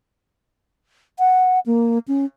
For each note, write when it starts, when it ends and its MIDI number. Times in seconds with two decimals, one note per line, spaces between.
1.19 1.59 78
1.66 1.98 58
2.08 2.25 61